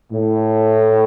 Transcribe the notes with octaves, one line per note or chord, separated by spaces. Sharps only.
A2